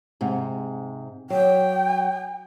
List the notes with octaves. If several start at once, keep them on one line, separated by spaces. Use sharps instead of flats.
G#2 C3
F#3 G5